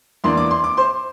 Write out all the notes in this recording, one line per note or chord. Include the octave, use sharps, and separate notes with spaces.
E2 E3 A#3 D4 C6
D6
C6
D6
C5 C6